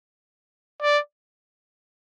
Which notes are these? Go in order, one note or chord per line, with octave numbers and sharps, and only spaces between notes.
D5